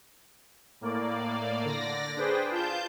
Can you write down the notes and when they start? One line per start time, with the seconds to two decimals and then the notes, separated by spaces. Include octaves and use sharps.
0.81 A2 A#3 D5
1.65 D3 D5 A#6
2.16 D4 G#4 B4 C5 G5
2.51 F4 A5 G6